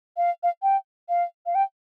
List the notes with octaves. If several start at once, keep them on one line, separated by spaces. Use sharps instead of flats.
F5
F5
G5
F5
F5
G5